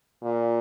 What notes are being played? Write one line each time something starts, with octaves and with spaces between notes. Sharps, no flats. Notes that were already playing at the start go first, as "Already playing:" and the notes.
A#2